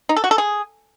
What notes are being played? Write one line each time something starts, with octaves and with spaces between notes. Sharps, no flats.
D#4
A4
F#4
A4
G#4